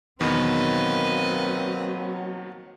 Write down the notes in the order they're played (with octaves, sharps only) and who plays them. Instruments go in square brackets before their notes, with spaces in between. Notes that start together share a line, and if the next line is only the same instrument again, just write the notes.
[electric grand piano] E2 B2 D#3 [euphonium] F#3 [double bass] A#3 C4 [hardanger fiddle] B4 D#5